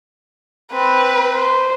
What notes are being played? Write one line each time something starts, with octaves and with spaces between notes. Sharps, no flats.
C4 B4
C5